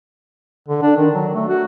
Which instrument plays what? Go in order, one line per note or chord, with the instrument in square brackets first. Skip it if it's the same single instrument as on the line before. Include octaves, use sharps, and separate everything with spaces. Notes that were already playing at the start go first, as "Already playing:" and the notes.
[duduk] D3
D4
D#3
F#3
A3
F#4